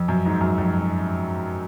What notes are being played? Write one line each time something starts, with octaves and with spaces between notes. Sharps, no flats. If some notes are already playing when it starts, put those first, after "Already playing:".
Already playing: F2
F#2
G#2
F#2
F2